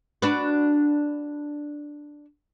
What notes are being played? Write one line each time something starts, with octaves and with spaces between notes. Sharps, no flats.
D4 F#4 B4